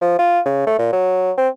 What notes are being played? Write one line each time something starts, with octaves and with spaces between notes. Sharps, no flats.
F3
F4
C#3
A3
A#2
F#3
C4